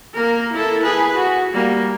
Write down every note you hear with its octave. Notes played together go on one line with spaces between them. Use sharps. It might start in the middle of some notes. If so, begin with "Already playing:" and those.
A#3 A#4
E4 A4
G#4 B4
F#4
G3 A#3